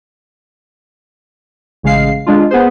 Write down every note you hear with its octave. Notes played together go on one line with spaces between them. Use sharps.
A1 C#3 G#3 F5 C7
G#3 D4 F4
B3 G#4 C5